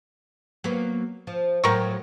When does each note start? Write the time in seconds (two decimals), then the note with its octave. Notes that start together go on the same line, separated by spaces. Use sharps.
0.64 F#3 A#3 B3
1.27 F3
1.64 A2 F#3 F4 A#4 G5 C#6